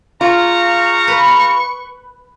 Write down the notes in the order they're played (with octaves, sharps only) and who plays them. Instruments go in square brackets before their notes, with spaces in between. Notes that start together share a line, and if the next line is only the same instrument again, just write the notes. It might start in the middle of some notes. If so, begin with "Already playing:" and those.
[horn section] C#3 F5 A#5 [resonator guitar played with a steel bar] F4 [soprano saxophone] C#6
[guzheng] B4